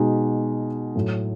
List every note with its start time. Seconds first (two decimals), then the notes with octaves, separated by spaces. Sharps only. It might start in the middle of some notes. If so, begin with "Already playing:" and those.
Already playing: B2 G#3 D#4
0.95 A2 F#3 A3